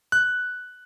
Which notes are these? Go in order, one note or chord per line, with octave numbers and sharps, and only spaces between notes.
F#6